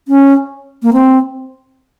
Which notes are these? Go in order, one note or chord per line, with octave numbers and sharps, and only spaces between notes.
C#4
A#3
C4